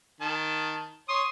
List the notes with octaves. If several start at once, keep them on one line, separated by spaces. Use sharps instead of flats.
D#3 A5
C#5 C6 D#6